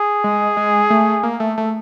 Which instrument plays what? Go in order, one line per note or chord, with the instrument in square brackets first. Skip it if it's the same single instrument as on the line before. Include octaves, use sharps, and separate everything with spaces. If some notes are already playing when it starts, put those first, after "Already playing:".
Already playing: [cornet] G#4
[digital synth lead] G#3
G#3
A3
A#3
A3
A3